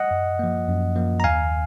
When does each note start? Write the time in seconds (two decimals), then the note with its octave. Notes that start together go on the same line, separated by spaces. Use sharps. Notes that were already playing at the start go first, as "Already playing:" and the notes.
Already playing: D#5 F#5
0.11 F#2
0.39 F3 A#3
0.68 F#2
0.96 F3 A#3
1.20 A#5
1.24 D#2 F5 G#5